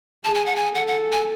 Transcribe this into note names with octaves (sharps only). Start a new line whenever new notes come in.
G#4 A5
G#5
F#5
G#5
A4 F#5
F#5
G#5